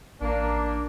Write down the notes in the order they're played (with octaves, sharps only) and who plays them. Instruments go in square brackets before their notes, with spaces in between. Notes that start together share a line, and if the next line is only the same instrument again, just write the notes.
[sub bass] A1 [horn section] A#3 D4